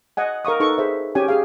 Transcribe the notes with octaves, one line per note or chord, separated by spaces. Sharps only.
D#5 F#5 G#5
A#4 F5 C#6 D#6
D#4 A4 B4 C#6 D#6
G#4 C5 E5
C#4 G4 G#5
G4 G#4 F5